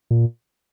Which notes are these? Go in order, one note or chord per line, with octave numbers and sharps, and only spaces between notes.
A#2